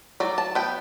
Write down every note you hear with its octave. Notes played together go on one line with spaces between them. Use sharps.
F#3 D5
A5
B3 G5